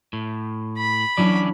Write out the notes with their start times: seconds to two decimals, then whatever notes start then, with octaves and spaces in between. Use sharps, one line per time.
0.13 A2
0.78 B5
1.17 E3 F#3 C#4 D4 E4 D5